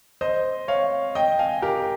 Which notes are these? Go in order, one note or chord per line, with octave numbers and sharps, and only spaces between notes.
C5 D#5
C#5 F5
D#5 G5
F5 G#5
G4 A#4